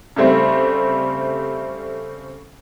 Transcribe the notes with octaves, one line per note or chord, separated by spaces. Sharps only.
C#3 G3 A3 C4